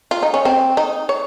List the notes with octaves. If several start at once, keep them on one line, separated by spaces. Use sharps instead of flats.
F4
D#4
C#4
C4
D#4
C#5